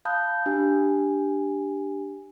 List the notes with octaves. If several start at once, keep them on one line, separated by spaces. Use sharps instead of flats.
F5 A5 B5 D#6 F#6 G6
D4 G4 G#5